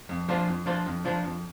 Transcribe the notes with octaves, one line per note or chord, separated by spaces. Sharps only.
F2
F3 D4 F4 C5
F2
F3 D4 F4 C5
F2
F3 D4 F4 C5
F2